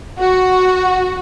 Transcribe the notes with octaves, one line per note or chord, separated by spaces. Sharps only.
F#4